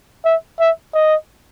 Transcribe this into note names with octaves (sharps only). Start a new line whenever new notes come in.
E5
E5
D#5